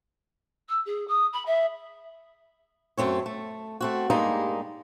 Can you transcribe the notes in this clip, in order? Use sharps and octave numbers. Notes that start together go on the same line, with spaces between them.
E6
G#4
D#6
B5
E5
F#2 B2 A3 C4 C#5
A3
A3 C4 F#4
G2 G3 G#3 A#3 D#4